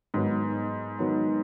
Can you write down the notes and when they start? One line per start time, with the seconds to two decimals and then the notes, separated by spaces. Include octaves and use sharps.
0.14 G#2 D#3 F#3 B3
0.99 D#3 F#3 B3